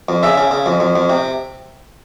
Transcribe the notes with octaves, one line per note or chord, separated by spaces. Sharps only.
F2
C#3 E5
C#3
C#3
F2
F2
F2
C3